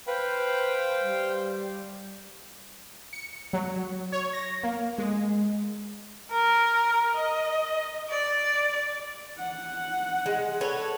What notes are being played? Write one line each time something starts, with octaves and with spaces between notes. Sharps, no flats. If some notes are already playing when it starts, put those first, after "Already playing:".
B4 C5 F5 G5
G3
C#7
F#3
C#5
A#6
A#3
G#3
A#4
D#5
D5
F#5
G#3
A4 B4 C#5